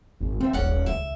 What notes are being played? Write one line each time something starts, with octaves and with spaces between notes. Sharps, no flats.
G#1 F2 A2
D3 F3 C4 D4 E5
D#1 G#1 D#2 C#4 D5 F#5
C#2 D#3 E5